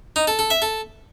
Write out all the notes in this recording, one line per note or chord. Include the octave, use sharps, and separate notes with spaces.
D#4
A4
A4
E5
A4